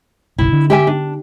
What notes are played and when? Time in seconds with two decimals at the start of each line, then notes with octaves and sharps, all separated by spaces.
0.38 F#1 B1 E4
0.53 D3
0.70 G4 E5 G#5
0.87 D4